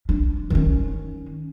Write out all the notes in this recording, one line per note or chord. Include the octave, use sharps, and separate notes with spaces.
D4
D#3 C#4